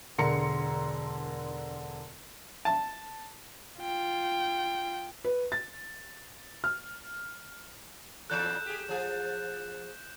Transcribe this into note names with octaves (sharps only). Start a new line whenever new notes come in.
E1 D3 A#4 A#5 C6 C#7
A5
F4 G5
B4
A6
F6
E2 E3 A4 F#6 G6 E7
G4 G#4
F3 G#4